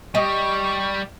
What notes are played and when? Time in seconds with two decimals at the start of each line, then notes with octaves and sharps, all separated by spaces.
0.15 G3 G4 D#5 C#6